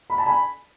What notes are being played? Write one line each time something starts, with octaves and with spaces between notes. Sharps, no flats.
B5
A5
G#5 B5